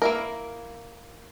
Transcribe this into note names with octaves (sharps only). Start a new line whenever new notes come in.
A#3 E4 A#4